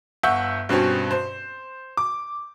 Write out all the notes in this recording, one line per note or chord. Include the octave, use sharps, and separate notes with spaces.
G1 E5 F#5 C#6 G6
G2 B2 C4 C#4
C5
D6